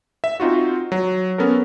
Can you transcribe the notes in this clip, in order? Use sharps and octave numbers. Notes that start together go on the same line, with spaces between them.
E5
C4 D#4 F4 F#4
F#3
B3 C#4 A4 A#4